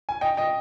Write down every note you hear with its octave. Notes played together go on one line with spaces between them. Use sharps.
G#5
D#5 G5
D#5 G5